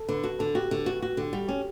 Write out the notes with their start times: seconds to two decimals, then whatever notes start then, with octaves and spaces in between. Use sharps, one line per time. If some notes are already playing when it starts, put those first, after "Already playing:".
Already playing: A4
0.09 D3 B4
0.24 F#4 A4
0.39 D3 A4
0.55 F#4 G4
0.71 D3
0.86 F#4
1.02 F#4
1.17 D3 G4
1.33 G3 F#4
1.48 C#4 G4